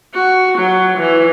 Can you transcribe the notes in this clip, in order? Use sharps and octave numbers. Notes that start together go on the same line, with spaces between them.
F#4
F#3
E3